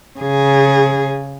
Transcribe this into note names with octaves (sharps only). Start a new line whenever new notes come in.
C#3 G#4